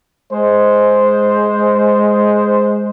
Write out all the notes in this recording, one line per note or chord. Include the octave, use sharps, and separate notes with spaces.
G#3 C5